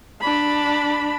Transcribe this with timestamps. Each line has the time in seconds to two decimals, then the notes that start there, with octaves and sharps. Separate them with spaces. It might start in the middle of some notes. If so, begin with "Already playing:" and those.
0.21 D4 B5